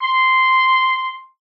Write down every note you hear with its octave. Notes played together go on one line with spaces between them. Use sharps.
C6